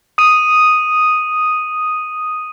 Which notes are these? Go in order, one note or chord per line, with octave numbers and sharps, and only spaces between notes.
D#6 D#7